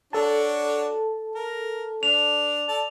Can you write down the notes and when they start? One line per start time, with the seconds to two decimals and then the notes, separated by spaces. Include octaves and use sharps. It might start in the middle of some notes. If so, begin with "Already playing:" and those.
0.13 D4 F#4 A4 C#5 A5
1.35 A#4
2.03 D4 F7
2.68 A4 D5 A5